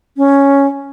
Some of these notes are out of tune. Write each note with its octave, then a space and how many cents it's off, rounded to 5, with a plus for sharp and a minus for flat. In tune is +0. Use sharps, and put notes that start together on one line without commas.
C#4 +5